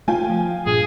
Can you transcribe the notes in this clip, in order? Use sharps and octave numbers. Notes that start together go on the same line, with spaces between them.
A3 F4 G5 G#5
F3
G2 A#2 G#4